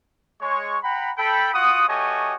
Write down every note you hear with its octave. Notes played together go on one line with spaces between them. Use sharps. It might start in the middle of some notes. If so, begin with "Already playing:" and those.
G#3 C#5 C#6
F#5 G5 A#5 B5
A4 G5 B5
F4 F#4 F#5 D#6
A3 F#4 G4 C#5 D#5 G#5